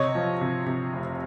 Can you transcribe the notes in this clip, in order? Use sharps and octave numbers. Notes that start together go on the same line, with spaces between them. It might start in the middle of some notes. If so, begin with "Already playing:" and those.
Already playing: C3 C#5 D#5
F3
C3
C3
F1